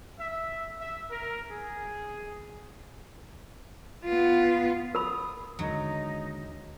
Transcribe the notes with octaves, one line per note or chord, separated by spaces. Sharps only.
E5
E5
A#4
G#4
B3 F4
A#4 B5 D#6
D#2 D3 F#3 G#3 D#4